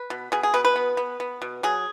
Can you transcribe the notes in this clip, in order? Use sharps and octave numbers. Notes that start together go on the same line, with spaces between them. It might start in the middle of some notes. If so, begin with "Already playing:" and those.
Already playing: B4
B2
B2 G#4
G#4
B2 B4
B4
B3
B3
B3
B2
F#3 G#4